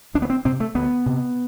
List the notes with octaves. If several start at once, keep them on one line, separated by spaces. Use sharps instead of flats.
D2 D4
B3
C4
C3 C4
A3
D2 B3
C3